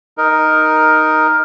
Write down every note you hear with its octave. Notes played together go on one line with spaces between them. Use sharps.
D#4 A#4